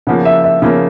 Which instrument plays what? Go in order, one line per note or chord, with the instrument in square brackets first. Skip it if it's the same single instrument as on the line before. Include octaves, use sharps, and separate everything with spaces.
[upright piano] C#3 F3 A#3 [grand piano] F#5
[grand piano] E5
E5
[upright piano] C#3 F3 A#3